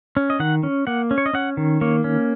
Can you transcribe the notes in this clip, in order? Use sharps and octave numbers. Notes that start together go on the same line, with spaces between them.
C#4
D#5
D#3 F#5
C#4
A#3 F#5
C#4
C#5
D#5
C#4 F#5
D#3
A#3 C#5
C#4